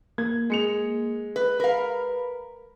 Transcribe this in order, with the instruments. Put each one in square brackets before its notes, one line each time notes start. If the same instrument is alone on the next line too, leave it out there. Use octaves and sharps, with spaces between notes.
[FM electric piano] A#3 [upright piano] G#6
[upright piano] G#3 C#7 F7
[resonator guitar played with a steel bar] B4
[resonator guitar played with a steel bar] A#4 F5 [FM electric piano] B4 B5